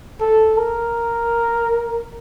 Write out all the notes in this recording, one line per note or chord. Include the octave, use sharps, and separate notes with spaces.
A4
A#4